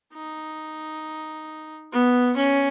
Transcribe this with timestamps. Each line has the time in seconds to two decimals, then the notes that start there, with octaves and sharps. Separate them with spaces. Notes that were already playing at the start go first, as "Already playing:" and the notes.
0.14 D#4
1.93 B3
2.37 C#4